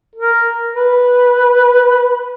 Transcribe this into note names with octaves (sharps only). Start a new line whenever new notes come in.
A#4
B4